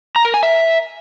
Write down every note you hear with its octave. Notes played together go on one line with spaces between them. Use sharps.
A#5
A#4
G#5
E5